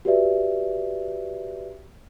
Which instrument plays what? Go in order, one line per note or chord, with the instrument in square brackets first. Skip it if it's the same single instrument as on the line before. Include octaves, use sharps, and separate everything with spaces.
[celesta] F#4 G4 B4 D5 E5